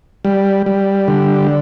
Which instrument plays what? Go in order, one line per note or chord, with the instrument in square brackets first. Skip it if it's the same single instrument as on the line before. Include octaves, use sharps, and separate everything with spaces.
[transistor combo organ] G3
G3
D3